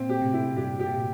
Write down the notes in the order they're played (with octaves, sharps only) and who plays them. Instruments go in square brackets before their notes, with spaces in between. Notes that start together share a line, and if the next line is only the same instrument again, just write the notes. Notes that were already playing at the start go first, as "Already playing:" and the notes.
Already playing: [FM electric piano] A#2 [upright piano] C4
[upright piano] G4
[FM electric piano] A2 C3
[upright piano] E4
[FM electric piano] G2 A#2 [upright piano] G4
[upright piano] G4
[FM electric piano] A#2
A2 C3